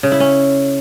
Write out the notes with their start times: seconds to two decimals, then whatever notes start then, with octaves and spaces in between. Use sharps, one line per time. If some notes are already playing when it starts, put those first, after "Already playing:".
0.03 C#3
0.12 E4
0.20 C#4